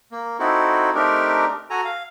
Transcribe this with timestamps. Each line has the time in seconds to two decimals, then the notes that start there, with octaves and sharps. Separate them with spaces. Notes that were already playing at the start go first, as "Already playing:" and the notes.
0.12 A#3
0.39 C4 D#4 E4 F#4 A4
0.95 A3 C4 D4 D#4 G4 A#4
1.70 F#4 A4 G#5 A#5
1.85 F5